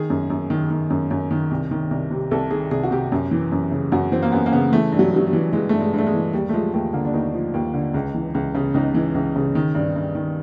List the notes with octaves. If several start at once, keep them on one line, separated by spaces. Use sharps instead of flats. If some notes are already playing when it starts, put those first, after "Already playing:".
Already playing: D#3 G#4
F#2
F#2
D#3
D#3
F#2
F#2
D#3
C2
D#3
C2
C3
C2 A4
D#3 G#4
C2 G#4
F#4
C3 G4
F#2
E3
F#2
C#3
F#2 F#4
E3 C4
A#3
F#2 B3
A#3
C#3 B3
E3 A3
G2
F#3
G2 F#3
G3
E3
E3 G#3
G2 A3
G#3
G2
A3
G#3
E3
D#2 G3
A3
F3 G#3
D#2 A3
D3 A#3
D4
D#2 D#4
F3
D#2
D3
C#2
E3
C#2
C#3
C#2 D#4
E3
C#2
C#3
D#3
G2
G2
D#3